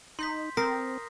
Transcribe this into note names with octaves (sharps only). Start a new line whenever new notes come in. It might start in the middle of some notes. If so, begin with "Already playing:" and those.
D#4 C6 G6 B6
C4 A#4 D#6 A#6 C7